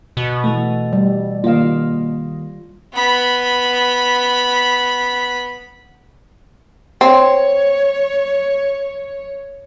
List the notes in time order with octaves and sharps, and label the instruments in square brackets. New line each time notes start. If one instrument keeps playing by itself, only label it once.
[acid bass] B2
[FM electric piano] E3 A3
[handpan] G3
[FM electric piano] D#3 A#3 [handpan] F4 F5
[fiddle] B3 B5
[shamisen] C4 [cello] C#5